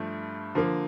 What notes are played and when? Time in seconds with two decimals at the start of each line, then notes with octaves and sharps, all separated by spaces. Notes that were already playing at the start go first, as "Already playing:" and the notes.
Already playing: G2 F3 A3
0.55 D3 F3 A#3